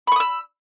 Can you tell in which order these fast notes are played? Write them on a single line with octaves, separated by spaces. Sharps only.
B5 C#6 D#6 E6